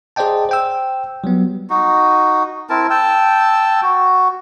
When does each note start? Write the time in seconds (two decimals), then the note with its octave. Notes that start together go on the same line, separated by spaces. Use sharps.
0.16 G#4 C5 D5 D#5 G5 A5
0.49 C5 G5 E6
1.24 F#3 G3 B3
1.70 D#4 F#4
2.70 C4 E4 A#4 A5
2.90 G5 A5 E6
3.82 F#4